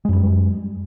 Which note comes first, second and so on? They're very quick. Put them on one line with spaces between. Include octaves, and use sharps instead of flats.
G#3 F#2 G3